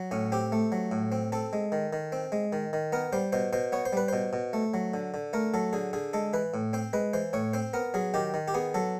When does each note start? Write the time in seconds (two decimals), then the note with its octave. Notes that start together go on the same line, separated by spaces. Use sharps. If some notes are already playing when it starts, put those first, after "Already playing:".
Already playing: F#3
0.11 A2 C#4
0.32 C4 G4
0.52 A3
0.72 F#3
0.92 A2
1.12 C4
1.32 C4 A4
1.53 G#3
1.72 D#3
1.93 D#3
2.12 C4
2.32 G#3
2.53 D#3
2.73 D#3
2.92 B3 A#4
3.13 G3 C5
3.33 B2 C5
3.53 B2 C5
3.72 B3 C#5
3.85 C5
3.93 G3 B4
4.08 B2 C5
4.33 B2
4.53 A3
4.74 F#3
4.94 D3
5.14 D3
5.33 A3 A#4
5.54 F#3 A4
5.73 D3 G#4
5.93 D3 G#4
6.13 G#3 A4
6.33 E3 B4
6.54 A2
6.73 C4 C5
6.93 G#3 B4
7.13 E3 C5
7.33 A2 C#5
7.53 C4 C5
7.74 B3 A#4
7.94 F#3 G#4
8.14 D#3 G4
8.34 D#3
8.48 G4
8.54 B3 G#4
8.74 F#3 A4